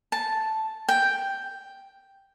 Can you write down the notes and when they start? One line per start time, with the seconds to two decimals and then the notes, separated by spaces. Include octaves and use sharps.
0.12 A5
0.89 G5